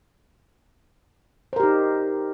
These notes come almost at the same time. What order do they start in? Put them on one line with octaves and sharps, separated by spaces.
C5 A#4 G4 D#4